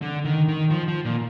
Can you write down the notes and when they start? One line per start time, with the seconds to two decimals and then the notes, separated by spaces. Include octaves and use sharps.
0.02 D3
0.25 D#3
0.48 D#3
0.70 F3
0.88 F3
1.05 A#2